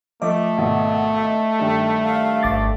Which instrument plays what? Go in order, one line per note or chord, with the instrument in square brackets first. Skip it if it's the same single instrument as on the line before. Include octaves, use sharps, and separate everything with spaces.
[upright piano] F3 D6 [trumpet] A3 [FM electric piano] D#5
[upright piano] G#1 B2
G2 D#3
[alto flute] F5
[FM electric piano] G#1 D6 A6